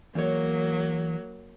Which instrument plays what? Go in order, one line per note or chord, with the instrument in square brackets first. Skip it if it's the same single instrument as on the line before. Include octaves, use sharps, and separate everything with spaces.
[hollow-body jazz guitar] E2 C#5 [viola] F#3 A#3